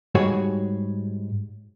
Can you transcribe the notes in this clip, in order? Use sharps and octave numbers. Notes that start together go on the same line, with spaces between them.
G#2 G3 F#4 G#4 C#5 F#5